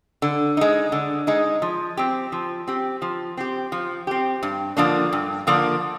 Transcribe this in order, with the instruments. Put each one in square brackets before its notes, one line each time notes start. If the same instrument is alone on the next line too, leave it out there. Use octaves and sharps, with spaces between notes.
[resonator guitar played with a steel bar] D3
G#3 D#4
D3
G#3 D#4
F3
C4 G4
F3
C4 G4
F3
C4 G4
F3
C4 G4
G2
D3 F3 A#3 D4
G2
D3 F3 A#3 D4